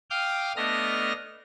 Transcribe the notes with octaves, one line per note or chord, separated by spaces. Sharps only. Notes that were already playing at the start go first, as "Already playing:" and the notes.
F5 G5 D6 D#6 F6 G6
A3 B3 D4 D#5 F6 A#6